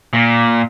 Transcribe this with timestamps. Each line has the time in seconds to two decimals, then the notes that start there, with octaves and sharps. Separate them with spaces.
0.13 A#2